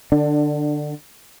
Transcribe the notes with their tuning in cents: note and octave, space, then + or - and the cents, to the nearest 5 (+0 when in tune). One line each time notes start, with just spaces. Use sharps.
D3 +25 D4 +5